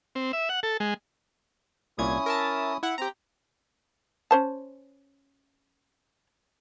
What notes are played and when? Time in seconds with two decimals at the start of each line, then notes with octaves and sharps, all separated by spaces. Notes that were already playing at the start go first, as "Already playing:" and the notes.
0.15 C4
0.33 E5
0.49 F#5
0.63 A4
0.80 G#3
1.98 C2 A#2 C#4 E4 D#6 G#6
2.26 A#4 E5 A5
2.83 E4 F#5
2.98 C4 G4 A#5
4.31 C#4 C5 A5